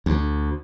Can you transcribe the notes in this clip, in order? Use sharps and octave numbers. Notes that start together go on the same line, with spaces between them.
D2